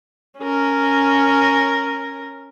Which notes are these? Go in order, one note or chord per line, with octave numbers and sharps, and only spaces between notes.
C#4 A#4